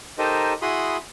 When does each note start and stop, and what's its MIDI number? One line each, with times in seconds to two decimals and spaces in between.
0.18 0.53 63
0.18 0.53 67
0.18 0.53 69
0.18 0.53 70
0.18 0.53 72
0.18 0.53 75
0.62 0.97 64
0.62 0.97 66
0.62 0.97 68
0.62 0.97 83
0.62 0.97 84
0.62 0.97 87